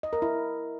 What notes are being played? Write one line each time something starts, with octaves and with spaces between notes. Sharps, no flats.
D#5
A#4
E4